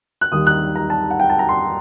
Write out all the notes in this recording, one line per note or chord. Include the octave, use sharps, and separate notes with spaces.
F#6
D#2 D#3 G3 D#6
F#6
A#5
A5
F#5
G5
A5
A#5
C6